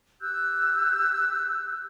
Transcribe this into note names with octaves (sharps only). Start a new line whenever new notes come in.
G4 E6 F#6 G6